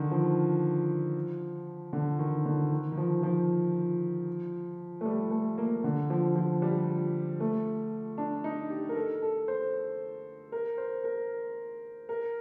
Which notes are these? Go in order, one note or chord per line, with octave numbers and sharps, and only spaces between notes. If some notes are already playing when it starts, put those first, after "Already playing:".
Already playing: D3 D#3
F3
D3
D#3
D3
D#3
D#3
F3
F3
A3
G3
A3
A#3
D3
F3
F3
G3
A3
D4
D#4
G4
A#4
A4
A4
C5
A#4
C5
A#4
A#4